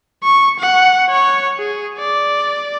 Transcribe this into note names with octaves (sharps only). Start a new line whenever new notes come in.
C#6
F#5
C#5
G#4
D5